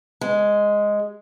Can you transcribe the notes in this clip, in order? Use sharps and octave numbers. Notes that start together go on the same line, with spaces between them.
G#3